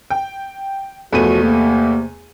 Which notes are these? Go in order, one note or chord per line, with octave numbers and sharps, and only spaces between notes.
G5
E2 B2 F3 A3 F#4 D#7
C3 A#3